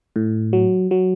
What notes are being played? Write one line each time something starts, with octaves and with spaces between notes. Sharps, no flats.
A2
F#3
F#3